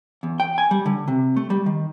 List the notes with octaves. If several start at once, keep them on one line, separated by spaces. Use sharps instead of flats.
E2
G5
G#5
G3
D3
C3
A3
G3
D#3